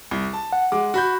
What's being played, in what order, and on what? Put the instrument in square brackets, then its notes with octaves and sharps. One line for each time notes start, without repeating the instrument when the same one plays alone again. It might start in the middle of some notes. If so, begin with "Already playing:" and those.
[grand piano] C2
A5
[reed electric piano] F#5
[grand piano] G#3 D6
F#4 B5 G6